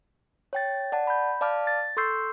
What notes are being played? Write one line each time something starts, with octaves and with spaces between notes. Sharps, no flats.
C#5 G5 A6
D5 F#5 A5
B5 G6
D5 F5 A5 D6 F6
A6
A4 C6 C#6 E6 G6 C7